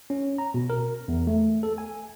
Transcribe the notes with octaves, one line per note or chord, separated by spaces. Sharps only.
C#4
A#5
B2
A#4
E2
A3
A4
G#5